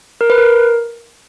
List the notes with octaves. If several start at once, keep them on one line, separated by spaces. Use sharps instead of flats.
A#4
B4
A#4